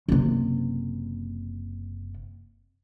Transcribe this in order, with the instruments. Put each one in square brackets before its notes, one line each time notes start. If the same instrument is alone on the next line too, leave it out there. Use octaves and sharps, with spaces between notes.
[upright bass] F#1 C3